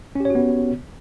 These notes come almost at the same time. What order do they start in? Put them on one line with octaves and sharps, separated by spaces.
C#4 G4 C#5 F#4 B3